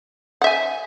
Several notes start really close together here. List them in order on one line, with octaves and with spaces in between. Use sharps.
F#5 E5 G#5